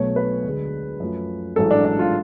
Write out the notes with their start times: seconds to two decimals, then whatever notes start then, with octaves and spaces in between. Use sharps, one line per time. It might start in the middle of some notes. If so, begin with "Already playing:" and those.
Already playing: B1 B2 F#3 A3 C#5
0.16 B4
0.44 D2 D3 G#3
1.00 F#2 F3 A3
1.56 A1 G#2 F#3 A4
1.71 D4
1.85 D4
1.99 F4